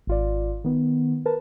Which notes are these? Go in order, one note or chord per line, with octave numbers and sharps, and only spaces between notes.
G#1 F4 D5
D#3 B3
A#4 B4 A5